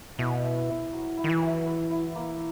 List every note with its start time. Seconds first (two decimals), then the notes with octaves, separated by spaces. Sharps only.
0.18 B2 E4
0.43 E5
0.68 E4
0.93 F#3
1.17 E4
1.24 D#3
1.29 E3
1.42 F#3
1.66 B4
1.91 E4
2.15 A#3